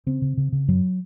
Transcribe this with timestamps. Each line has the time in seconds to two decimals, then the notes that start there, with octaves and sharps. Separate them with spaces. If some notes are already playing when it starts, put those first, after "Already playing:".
0.06 C#3 C4
0.22 C#3
0.37 C#3
0.52 C#3
0.68 F#2 F#3